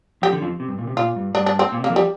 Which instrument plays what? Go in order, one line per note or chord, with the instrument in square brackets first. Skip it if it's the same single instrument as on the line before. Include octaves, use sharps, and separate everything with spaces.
[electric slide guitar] F2 F3 [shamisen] G4
[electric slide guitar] D3
F2 F3
C3
G2
A#2
C3
[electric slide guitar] A#2 [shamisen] F4
[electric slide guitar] G2
[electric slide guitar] G2 [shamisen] D4
[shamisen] D4
C4
[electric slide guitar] A#2
C3
[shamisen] A#3
[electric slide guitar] F2 F3
[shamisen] G3